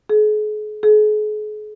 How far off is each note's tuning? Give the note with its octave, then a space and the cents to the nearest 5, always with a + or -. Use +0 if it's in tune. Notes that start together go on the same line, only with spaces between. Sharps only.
G#4 +40
G#4 +40